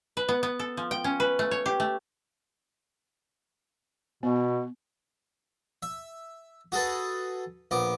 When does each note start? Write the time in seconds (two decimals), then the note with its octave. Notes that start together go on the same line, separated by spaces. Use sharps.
0.17 B4
0.29 B3
0.43 B3
0.59 A4
0.77 F3
0.91 G5
1.04 C#4
1.20 B4
1.39 A3
1.51 C#5
1.66 G4
1.80 A3
4.23 B2 B3
5.83 E5
6.72 F#4 G#4 A4 B4
7.71 A#1 B3 D6